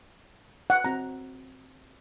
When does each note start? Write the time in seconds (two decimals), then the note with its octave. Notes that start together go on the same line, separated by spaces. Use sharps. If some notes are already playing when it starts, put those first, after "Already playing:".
0.70 F#5
0.84 C4 F#4 A#5